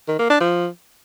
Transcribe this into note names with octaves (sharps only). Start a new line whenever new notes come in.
D#3
A#3
D4
F3